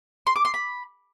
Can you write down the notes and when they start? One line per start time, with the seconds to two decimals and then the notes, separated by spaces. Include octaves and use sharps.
0.27 C6
0.36 D6
0.45 C6
0.54 B5